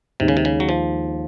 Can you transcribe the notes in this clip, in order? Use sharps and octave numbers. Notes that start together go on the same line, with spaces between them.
D#2 C3 D#3 G#3 D#4
C#3
C3
C#3
F#3
F3